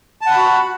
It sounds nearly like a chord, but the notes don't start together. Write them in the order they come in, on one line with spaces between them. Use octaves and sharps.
A5 F#5 B5 F#4